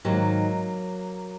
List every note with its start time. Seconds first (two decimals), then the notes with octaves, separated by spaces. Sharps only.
0.05 G#2 D#3 F#3 A#3